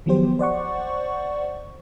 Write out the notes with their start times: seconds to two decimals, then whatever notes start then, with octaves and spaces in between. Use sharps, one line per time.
0.06 D#3 F3 F#3 B3 G4 C5
0.39 C5 D5 F#5 C#6